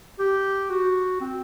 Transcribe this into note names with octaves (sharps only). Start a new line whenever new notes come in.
G4
F#4
C4